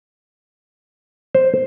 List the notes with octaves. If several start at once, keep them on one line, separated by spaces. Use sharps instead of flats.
C5